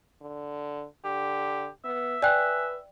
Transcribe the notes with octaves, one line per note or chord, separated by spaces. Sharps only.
D3
D3 G4
B3 E5
B4 D5 G5 G#5 F#6